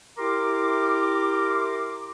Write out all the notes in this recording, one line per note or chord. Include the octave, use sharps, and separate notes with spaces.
E4 G4 A#4 A#5 C6 D6